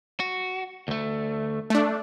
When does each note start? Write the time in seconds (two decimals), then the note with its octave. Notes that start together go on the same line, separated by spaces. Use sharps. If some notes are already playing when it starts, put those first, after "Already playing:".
0.20 F#4
0.88 D2 A3
1.70 A3 D4